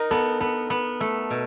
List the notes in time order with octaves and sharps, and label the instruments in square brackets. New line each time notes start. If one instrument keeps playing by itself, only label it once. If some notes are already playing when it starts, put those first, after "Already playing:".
Already playing: [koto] D#4 [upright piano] A#4
[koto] B3 [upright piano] A4
[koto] B3 [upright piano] A4
[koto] B3
A3
B2